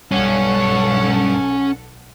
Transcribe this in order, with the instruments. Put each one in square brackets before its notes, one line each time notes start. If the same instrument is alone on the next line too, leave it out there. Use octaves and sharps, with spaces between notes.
[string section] B1 A4 F#5 [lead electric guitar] G2 [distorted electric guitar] C#4